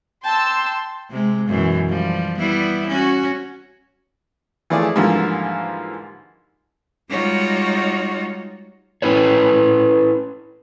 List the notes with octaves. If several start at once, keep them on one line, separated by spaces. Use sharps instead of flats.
G5 A5 C6 E6
C3 G#3
F#2 B2 E3
F3 G3
G3 B3 E4
C#4 F#4
E3 F3 A3 G#4 D5
G#2 D3 E3 F3 G3 A#3
G3 G#3 D#4 F4 F#4 C#5
C#4 E4 B4 C#5